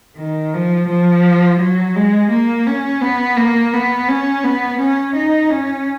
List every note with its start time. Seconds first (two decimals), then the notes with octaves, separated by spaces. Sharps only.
0.17 D#3
0.54 F3
0.89 F3
1.60 F#3
1.96 G#3
2.31 A#3
2.67 C#4
3.01 B3
3.37 A#3
3.73 B3
4.09 C#4
4.44 B3
4.79 C#4
5.15 D#4
5.50 C#4